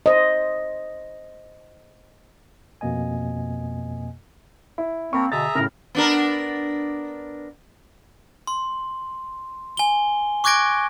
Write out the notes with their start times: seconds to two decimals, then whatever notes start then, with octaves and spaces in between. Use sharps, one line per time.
0.06 C5 D#5
2.81 F2 B2 A#3 D#5 G#5
4.78 E4
5.13 A#3 C4 A#4 C#5 A5 B5 C#6
5.32 B2 D3 G#4 E5 A#5 A6
5.55 A2 C#3 A#4 F6
5.95 B3 D4 A#4
8.47 C6
9.77 G#5 G7
10.44 C#6 D6 F#6 G#6 A#6 D7